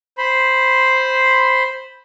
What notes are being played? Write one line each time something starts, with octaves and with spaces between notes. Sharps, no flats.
C5 B5 C6